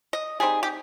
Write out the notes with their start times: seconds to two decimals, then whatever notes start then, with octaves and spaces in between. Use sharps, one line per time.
0.13 D#5
0.40 G3 C4 D#4 G#4
0.63 G4